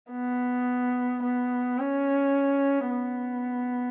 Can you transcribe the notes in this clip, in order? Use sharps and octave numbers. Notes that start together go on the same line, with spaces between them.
B3
B3
C#4
B3